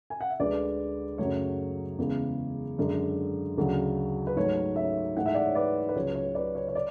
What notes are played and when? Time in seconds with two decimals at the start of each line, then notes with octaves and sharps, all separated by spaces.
0.10 G#5
0.21 F#5
0.30 E5
0.40 D2 D3 G#3 B4 D5
1.18 F#2 C#3 F#3 A3 C#5
1.98 E2 C#3 G#3
2.78 F#2 D3 G#3
3.58 D2 C#3 F#3
4.27 B4
4.36 G#2 F#3 A3 C#5
4.76 C#5 E5
5.17 G#2 E3 A3 F#5
5.26 E5
5.34 D5 F#5
5.46 C#5
5.55 B4 D5
5.89 B4
5.96 C#2 C#3 F#3 C#5
6.15 C#5
6.35 B4 D5
6.55 C#5
6.68 C#5
6.75 D5